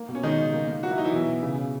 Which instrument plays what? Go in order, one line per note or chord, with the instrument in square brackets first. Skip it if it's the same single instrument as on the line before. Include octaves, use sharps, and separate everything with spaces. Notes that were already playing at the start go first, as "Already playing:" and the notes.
Already playing: [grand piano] A#3
B2
[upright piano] C#4
[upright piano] D#3 D#4 [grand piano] G#3
[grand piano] C#3
A#3
A#3
[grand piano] F#3 [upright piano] F#4
[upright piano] E4
[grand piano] F#3 [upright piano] D#4
[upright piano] E3 E4
[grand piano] B2
B2
C#3
C#3